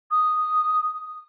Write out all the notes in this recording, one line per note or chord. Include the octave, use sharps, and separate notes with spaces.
D#6